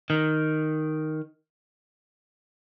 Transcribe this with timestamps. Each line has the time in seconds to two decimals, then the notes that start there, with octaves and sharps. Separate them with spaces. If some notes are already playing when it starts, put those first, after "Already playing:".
0.10 D#3